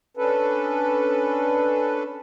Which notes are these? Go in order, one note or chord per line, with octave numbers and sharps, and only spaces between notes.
C#4 D4 A4 B4